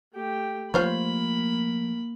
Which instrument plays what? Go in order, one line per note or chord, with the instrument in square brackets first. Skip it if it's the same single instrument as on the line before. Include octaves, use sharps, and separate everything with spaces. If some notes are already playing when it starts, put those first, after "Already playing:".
[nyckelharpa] A3 G4
[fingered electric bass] F3 A3 [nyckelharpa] A#3 B5 [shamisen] F4 C5 C#5